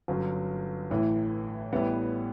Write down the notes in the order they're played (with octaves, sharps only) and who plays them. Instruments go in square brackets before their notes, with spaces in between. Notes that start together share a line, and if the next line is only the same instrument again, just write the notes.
[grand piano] G1 F#2 F#3
A1 A2 E3
A1 A2 E3 G3 B3